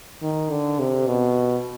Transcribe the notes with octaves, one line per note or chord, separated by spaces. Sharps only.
D#3
D3
C3
B2